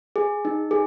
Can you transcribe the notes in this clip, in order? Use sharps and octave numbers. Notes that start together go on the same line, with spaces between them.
G#4
D#4
G#4